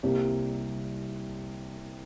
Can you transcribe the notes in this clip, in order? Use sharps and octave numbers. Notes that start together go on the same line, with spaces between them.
C2 C3 G3 A#3 G4